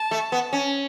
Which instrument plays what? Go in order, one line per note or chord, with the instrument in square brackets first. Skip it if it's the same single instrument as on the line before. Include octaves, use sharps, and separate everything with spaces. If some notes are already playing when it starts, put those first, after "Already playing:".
Already playing: [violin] A5
[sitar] A3
B3
C#4